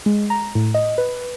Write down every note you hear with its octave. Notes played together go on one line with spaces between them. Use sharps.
G#3
A#5
A2
D#5
B4